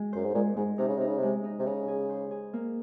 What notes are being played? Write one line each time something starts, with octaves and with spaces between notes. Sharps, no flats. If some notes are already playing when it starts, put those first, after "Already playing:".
Already playing: G#3 F#4
F#2 C5
G#2
A#2 G#3
G#2 G#3
C3 D#4
C#3
C3 D#4
C#3
C3
G#3
D#4
C3
C#3 D#4
G#4
C5
G#4
A#3